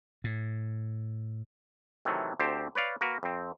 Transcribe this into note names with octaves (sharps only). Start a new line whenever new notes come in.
A2
C3 D#3 E3 F#3 A3
D2 C4 G4 C5 A5
B4 C#5 D5 F5
A#3 F#4 A#4 B4
F2 C4